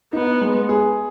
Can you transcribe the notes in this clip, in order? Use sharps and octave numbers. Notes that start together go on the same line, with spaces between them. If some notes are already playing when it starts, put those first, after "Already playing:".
B3 D#4
G#3
G#4